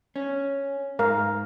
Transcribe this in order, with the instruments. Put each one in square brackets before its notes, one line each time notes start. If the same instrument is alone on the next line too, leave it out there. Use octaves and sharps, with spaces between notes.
[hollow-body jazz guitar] C#4
[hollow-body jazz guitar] G#2 [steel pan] A#4 F5